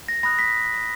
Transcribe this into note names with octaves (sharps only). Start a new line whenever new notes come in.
A#6
B5 D#6 F#6 A#6
B6